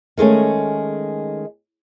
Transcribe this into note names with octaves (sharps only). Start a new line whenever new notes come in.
D#3 G#3 A3 C#4